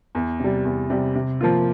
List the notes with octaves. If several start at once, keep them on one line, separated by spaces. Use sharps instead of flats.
E2
C3 G3
E2
C3 G3
C3
F3 A#3 F4